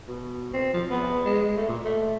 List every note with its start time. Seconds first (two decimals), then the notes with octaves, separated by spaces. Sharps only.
0.08 B2
0.54 C4
0.74 F3
0.91 B3
1.26 G#3
1.57 A3
1.69 A#2
1.84 A3